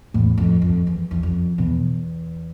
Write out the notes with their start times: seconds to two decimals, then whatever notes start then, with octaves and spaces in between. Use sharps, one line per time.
0.14 E2 A2
0.38 F2
0.62 F2
0.87 E2
1.11 E2
1.23 F2
1.58 E2 B2